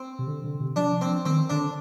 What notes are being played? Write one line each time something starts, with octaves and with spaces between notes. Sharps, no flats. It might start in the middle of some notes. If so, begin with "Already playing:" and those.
Already playing: C4
C3
D3
D3
C3
F3 D4
C4
D#3 C4
D3 D4